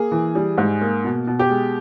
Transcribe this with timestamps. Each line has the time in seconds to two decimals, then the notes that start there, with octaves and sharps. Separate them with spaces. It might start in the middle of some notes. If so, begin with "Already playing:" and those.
Already playing: A#3 G#4
0.11 E3
0.35 G3
0.58 G#2
0.81 A#3
1.04 B2
1.27 B2
1.39 G4
1.50 G#3